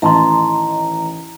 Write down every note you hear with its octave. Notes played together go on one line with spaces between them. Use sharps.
A1 D#3 D#5 A5 A#5 C6